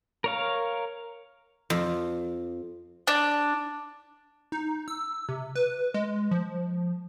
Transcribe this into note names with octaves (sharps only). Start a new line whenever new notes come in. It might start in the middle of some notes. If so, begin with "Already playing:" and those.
A#4 C#5 F5
F2
D4
D#4
E6
C3
B4
G#3
F3